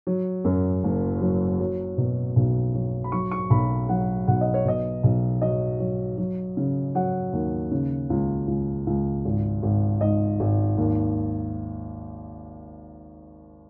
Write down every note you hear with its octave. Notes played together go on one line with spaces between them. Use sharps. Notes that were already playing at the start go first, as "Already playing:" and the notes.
F#3
F#2
F#1
F#3
F#3
B2
B1
F#3
B5
F#3 C#6
C#6
B1 B5
F#3 F#5
B1 F#5
D#5
C#5
B2 D#5
B1
F#3 D#5
F#3
F#3
C#3
F#3 F#5
D#2
C#3
C#2
C#2
C#2
G#1
G#1
G#2 D#5
G#1
D#2